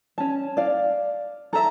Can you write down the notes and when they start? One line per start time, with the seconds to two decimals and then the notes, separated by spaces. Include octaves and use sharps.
0.18 C#4 A5
0.57 D5 F5
1.53 A4 E5 A#5